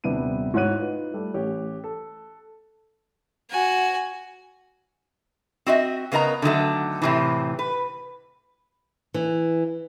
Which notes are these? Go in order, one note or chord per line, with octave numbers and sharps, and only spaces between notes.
D#1 C3 G3 B3 D4 D#7
G#2 E4 F#4 C#5 F#6 D#7
D#4 F4 B4
G3 A3
A1 G4 C#5
A4
F#4 G#5
C4 F#4 D#5 E5
C#3 B3 A#4 D#5 A#5
D3 D#3 F#3 A3
A2 C3 E3
B4
E3